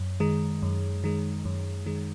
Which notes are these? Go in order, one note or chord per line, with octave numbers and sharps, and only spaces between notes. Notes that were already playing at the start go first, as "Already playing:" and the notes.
Already playing: F#2
D#3 G#3
F#2
D#3 G#3
F#2
D#3 G#3